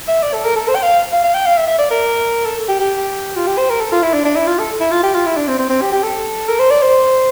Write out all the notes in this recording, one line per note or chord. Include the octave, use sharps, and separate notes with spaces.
E5
D5
A4
A#4
A4
C5
G5
F5
F5
F5
G5
F5
E5
E5
D5
A#4
A4
G4
G4
F4
G4
C5
A#4
A4
F4
E4
D4
D4
E4
F4
A4
E4
F4
G4
F4
E4
D4
C4
C4
C4
G4
G4
A4
A#4
C5
D5
C5